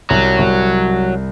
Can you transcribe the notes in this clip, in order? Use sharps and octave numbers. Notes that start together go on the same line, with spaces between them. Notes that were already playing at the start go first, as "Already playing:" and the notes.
C2 F#3
C2